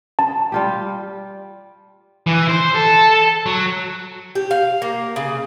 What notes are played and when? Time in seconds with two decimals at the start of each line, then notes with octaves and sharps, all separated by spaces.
0.19 A5
0.52 G3 F4 G4
2.27 E3
2.49 C5
2.75 A4
3.46 F#3
4.35 G4
4.51 F5
4.82 A#3
5.16 C#3